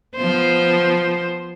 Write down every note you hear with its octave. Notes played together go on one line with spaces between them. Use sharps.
F3 B3 C5